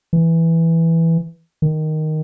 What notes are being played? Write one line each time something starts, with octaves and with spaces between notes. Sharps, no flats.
E3
D#3